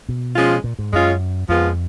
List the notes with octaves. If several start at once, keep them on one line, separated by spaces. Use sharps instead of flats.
B2
F3 G#3 C#4 F4
A#2
G#2
F#2 G#3 C#4 F4 G#4
F2 F3 G#3 B3 F4